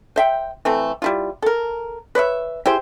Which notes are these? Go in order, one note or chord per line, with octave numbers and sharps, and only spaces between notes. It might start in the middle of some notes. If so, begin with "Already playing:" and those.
C5 E5 G5
E3 A3 C4
G3 E4 F4
A4 A#4
B4 C#5 D5 E5
E4 G4 G#4 C5